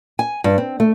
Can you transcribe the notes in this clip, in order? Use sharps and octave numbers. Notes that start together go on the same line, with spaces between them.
G#5
G2
C4
A3